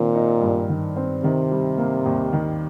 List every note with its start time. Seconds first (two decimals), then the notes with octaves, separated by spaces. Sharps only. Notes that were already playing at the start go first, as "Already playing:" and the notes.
Already playing: A#2 D#3 C4
0.15 D#4
0.41 G2
0.69 D#3
0.96 C4
1.23 C3 D#3
1.51 G3
1.78 A#3
2.06 D#2
2.33 D#3